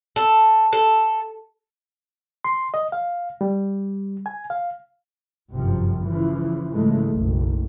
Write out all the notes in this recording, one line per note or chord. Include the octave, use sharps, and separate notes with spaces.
A4
A4
C6
D#5
F5
G3
G#5
F5
G1 F#2 C3 F3
C#3 E3 F3
G#2 C#3 E3 G#3 A3
F#1 B1